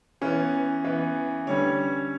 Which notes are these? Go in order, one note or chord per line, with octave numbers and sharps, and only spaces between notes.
E3 B3 C#4
E3 B3
D3 G3 C#4 C#5